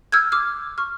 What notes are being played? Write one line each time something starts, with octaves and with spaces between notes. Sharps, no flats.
E6 F6 G6 G#6
D6 F6
C#6 F6